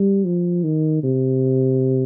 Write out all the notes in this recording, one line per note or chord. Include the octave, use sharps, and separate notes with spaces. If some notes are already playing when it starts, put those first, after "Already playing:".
Already playing: G3
F3
D#3
C3